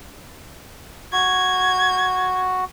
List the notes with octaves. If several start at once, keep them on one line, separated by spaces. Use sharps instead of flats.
F#4 G#6